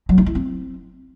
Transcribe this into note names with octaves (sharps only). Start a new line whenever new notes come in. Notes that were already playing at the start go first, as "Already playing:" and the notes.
F#3
D#4
E4
C4